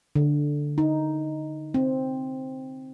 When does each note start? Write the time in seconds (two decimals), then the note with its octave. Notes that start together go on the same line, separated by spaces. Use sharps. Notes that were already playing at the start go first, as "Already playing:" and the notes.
0.15 D3
0.78 D#4
1.74 C4